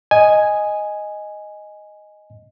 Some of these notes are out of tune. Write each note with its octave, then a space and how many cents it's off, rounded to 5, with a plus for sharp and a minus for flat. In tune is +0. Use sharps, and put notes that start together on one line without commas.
D#5 +0 G#5 +0